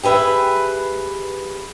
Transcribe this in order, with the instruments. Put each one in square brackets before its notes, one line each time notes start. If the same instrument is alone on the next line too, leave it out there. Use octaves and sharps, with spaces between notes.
[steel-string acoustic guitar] G4 G#4 B4 E5